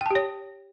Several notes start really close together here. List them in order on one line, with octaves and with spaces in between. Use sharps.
G5 A5 G4 C#5